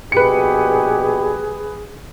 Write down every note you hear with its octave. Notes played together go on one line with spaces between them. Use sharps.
A#1 B2 G4 G#4 B4 C#7